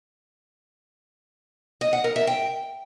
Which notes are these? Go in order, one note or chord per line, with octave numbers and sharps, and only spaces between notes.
D#5
F#5
A#4
E5
G5